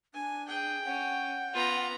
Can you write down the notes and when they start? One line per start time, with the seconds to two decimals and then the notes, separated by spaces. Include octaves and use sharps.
0.14 D4 G#5
0.48 G#4 G5
0.85 C#4 F#5
1.54 B3 F4 A#5